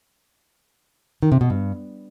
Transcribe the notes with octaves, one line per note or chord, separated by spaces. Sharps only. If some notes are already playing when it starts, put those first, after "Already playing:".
D#3
C3
B2
G2